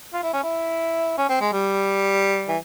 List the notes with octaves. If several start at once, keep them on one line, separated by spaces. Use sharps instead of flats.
F4
E4
C#4
E4
C#4
C4
G#3
G3
E3